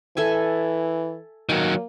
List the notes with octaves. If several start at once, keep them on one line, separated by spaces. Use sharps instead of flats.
E3 A4 E5 G#5
D#3 F#3 A#3